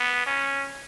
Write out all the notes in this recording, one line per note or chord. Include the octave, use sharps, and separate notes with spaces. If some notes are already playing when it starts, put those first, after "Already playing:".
Already playing: B3
C#4